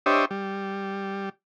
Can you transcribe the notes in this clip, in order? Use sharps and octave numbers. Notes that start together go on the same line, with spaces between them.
D4 G4 C5 C#5 D#5 E5
G3